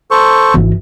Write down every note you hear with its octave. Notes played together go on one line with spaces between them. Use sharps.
A4 C5 C#6
G#1 E3